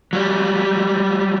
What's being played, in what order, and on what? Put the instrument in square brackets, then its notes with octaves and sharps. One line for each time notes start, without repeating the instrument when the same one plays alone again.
[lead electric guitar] F#3 G3